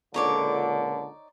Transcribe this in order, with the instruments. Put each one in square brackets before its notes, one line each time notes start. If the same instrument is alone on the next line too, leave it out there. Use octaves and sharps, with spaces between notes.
[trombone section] C#2 A#2 D3 [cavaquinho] D#4 C#5 D5